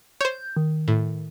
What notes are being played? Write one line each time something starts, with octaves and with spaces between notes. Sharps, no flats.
C5 C#5 G6
D#3
A2